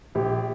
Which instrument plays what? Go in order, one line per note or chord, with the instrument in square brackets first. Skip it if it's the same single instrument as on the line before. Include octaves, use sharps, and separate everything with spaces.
[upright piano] A#1 G4